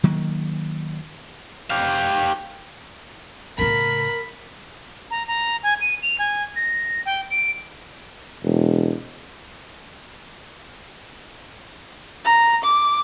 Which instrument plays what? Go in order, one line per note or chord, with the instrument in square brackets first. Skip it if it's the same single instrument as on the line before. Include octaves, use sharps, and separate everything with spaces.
[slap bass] D#3 F#3 A#3
[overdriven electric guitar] G4 F5
[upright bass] A2 C#3 [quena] A#4 [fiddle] B5
[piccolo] A#5
A#5
G#5
D#7
F7
G#5
A#6
G5
D7
[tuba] E1
[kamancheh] A#5
D6